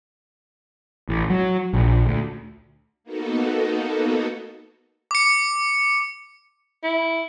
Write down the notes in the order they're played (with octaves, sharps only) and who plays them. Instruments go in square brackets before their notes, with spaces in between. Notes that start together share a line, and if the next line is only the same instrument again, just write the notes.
[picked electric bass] A1
F#3
A#1
D2
[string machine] A#3 B3 D#4 F#4 A4
[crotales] D6 C#7
[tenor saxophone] E4